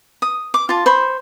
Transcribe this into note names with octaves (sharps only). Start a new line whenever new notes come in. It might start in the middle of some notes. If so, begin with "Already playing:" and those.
D#6
D6
F4 A5
C5 B5 C#6